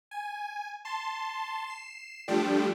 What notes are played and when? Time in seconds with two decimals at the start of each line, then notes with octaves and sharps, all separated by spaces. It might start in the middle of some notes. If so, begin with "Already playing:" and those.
0.11 G#5
0.85 A5 C6
1.67 C7 E7
2.28 F3 G3 A3 D4 G4